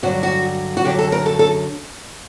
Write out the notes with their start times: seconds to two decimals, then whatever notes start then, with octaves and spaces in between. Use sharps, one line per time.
0.03 G2 D3 F#3 F#4
0.23 F#4
0.77 F#4
0.84 F#2 D3 F#3 G4
0.99 A4
1.12 A#4
1.26 A4
1.39 A4